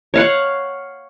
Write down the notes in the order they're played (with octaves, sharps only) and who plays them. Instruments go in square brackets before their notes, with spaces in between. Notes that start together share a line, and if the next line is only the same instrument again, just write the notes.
[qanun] C#5 F5 F#5